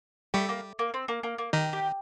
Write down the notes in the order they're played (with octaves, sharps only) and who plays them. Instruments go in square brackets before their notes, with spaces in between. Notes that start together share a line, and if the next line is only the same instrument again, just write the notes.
[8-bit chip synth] G3 G4 [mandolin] A3
[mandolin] A#3
A#3
C4
A#3
A#3
A#3
[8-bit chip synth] D#3 D#4 [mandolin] G4
[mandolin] G4